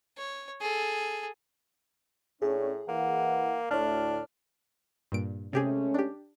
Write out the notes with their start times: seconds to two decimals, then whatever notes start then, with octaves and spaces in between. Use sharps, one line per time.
0.17 C#5
0.61 G#4 A4
2.42 A2 C#4 D4 G#4 C#5
2.88 E3 A#3 F#5
3.71 D2 A2 D4 C#5 F6
5.12 G2 A#2 D7
5.53 C3 G#3 A3 C#4 G4 G#4
5.94 D4 G4